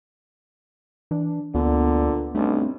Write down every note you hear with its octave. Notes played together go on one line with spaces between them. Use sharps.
E3 D4
D2 A#2 D3 B3
B1 G2 A3 C4